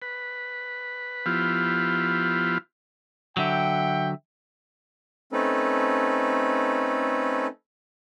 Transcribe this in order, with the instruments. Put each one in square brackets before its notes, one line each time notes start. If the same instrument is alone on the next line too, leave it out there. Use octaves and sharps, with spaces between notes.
[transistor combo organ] B4
F3 B3 E4 F4 G4
[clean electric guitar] D3 F#3 [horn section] E5 F#5 G5
[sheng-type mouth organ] A3 C4 C#4 D#4 A4 B4